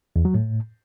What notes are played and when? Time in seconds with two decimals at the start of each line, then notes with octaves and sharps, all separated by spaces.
0.16 E2
0.25 F#3
0.34 A2